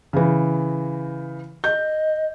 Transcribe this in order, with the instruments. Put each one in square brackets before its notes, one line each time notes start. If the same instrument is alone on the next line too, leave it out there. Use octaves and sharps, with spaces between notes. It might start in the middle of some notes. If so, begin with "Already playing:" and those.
[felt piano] C#3 E3
[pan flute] D#5 [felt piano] G6